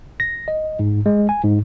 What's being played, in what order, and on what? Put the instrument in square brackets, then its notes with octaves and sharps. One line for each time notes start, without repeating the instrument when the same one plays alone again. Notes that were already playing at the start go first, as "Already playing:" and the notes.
[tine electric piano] A#6
D#5
G#2
G#3
G#5
G#2